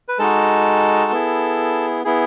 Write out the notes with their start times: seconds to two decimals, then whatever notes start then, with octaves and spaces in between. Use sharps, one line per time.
0.08 B4
0.19 G#3 D#4 F#4 A4
1.12 B3 E4 G#4
2.05 B3 E4 G#4